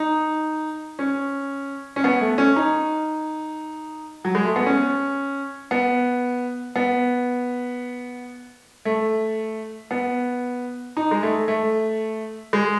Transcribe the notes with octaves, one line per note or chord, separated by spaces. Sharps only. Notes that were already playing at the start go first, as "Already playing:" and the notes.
Already playing: D#4
C#4
C#4
B3
A3
C#4
D#4
F#3
G#3
A3
B3
C#4
B3
B3
A3
B3
D#4
G#3
A3
A3
G#3